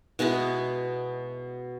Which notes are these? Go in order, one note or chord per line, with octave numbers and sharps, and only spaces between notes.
B2 G#3 B3 E4